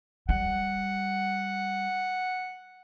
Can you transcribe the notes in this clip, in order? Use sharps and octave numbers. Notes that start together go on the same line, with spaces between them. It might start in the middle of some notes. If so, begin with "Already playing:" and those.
G3 F#5